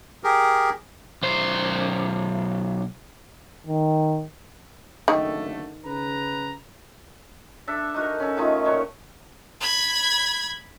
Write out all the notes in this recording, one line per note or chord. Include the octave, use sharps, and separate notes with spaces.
G4 G#4 A#4
B1 C5
D#3
F#1 D3 D#3 A3
C#3 B4 A#5
D4 A4 E5
D#4 F#4 A#4
C#4 A4
D#3 A3 D#4 F4
A#2 F#3 C#5
B5 G#6